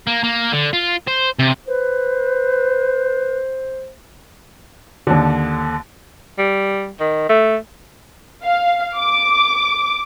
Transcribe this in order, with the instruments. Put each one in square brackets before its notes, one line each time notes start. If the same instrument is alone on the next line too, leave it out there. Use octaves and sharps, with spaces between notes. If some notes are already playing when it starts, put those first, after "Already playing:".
[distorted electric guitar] A#3
A#3
D3
F4
C5
C3
[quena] B4 [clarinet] C5
[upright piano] D#2 D3
[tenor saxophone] G3
D#3
A3
[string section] F5
D6